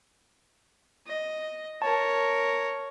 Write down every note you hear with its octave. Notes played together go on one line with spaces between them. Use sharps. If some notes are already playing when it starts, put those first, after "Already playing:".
D#5
A#4 C#5 A5